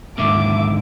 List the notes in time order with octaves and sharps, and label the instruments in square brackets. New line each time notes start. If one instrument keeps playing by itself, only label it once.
[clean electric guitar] D#2 G#2 D3 [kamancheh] E5 D6